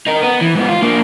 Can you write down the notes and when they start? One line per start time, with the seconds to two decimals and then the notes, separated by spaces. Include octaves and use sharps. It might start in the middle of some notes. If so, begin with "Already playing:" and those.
0.07 D#4 A#4
0.23 B3
0.41 E3
0.55 G#2 B3
0.68 F4
0.82 A#3 D4